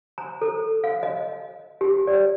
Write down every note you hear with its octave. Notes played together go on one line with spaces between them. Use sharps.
A#5
A4
F5
D#5
G4
D5